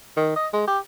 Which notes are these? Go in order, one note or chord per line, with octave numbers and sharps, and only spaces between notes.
D#3
D#5
G#3
G4